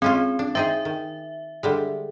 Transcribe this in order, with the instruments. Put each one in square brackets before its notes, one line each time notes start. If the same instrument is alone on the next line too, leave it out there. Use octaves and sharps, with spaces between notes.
[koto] G#3 C#4 F4 [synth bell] C4
[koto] D4
[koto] C4 D#4 G#4 [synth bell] E5
[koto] D#3
D3 G3 G#3